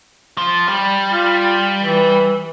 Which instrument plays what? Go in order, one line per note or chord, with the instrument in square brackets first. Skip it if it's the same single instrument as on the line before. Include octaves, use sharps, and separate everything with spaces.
[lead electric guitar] F3
G3
[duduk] F4
E3